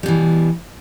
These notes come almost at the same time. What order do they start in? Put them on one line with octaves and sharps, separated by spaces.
G3 B2 E3